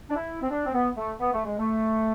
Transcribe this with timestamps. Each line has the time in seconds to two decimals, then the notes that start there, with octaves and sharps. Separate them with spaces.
0.10 D4
0.15 E4
0.42 C4
0.50 D4
0.66 C4
0.73 B3
0.96 A3
1.20 B3
1.33 A3
1.45 G#3
1.58 A3